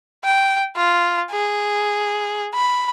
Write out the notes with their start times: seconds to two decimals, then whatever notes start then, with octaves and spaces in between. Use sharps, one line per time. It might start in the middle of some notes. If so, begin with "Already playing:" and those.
0.24 G5
0.77 F4
1.32 G#4
2.54 B5